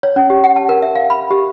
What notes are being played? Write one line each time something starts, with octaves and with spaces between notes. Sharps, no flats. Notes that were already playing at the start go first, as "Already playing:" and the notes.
C#5
C#4
G4
F#5
A5
A#4
E5
F5
B5
G4